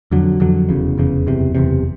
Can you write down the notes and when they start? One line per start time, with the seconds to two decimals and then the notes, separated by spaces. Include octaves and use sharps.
0.11 F2 D3 F#3
0.40 F2 D3 F#3
0.69 F1 E2 C#3
0.98 F1 E2 C#3
1.27 F#1 E2 C3
1.55 F#1 E2 C3